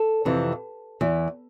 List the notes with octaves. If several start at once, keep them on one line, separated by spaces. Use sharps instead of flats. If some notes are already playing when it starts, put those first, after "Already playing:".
Already playing: A4
F2 C3 E3
E2 E3